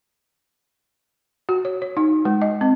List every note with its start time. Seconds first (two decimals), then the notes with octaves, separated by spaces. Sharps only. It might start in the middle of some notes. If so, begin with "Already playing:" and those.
1.49 F#4
1.65 C#5
1.82 C#5
1.97 D#4
2.25 G#3
2.42 D#5
2.61 C4